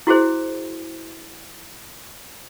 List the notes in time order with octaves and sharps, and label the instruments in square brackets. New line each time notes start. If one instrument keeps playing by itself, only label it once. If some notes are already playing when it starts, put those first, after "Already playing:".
[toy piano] E4 F#4 G#4 C5